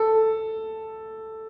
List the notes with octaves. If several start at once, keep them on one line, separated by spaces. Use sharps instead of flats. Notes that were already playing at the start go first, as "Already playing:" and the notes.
Already playing: A4